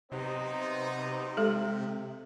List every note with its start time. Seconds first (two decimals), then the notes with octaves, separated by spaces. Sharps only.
0.12 C3 F#3 B3 D#4 C5
1.37 G#3 G4 A4